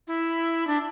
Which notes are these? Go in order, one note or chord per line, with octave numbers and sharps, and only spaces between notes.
E4
D4